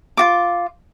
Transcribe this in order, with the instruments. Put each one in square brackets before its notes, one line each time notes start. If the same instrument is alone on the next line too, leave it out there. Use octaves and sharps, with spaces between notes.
[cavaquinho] F4 F#4 D6